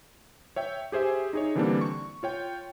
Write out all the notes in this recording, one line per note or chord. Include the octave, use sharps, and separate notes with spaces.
C#5 E5 G5
G4 G#4 C5 E5 G#5
D#4 G#4 C#5
D3 E3 G3 A#3 C4 D4
C#6
F4 C#5 G5